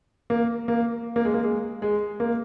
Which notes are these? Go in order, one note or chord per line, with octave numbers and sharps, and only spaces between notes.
A#3
A#3
A#3
G#3
A#3
G#3
G#3
A#3